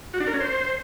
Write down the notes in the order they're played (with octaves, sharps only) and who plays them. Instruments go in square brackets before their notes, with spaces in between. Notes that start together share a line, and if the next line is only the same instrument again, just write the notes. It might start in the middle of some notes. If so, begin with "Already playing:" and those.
[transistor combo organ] F#4
D4
A#4
C#4
C5